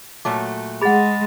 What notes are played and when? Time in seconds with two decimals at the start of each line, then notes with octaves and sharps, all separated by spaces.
0.25 A#2 F#3 A3 D6
0.81 G#3 G#4 F#5 B5 A6